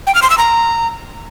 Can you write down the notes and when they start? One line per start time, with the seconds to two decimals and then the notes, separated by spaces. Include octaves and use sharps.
0.07 G5
0.15 F6
0.22 C6
0.30 E6
0.38 A#5